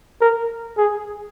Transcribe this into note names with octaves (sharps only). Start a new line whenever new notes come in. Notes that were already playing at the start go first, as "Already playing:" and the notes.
A#4
G#4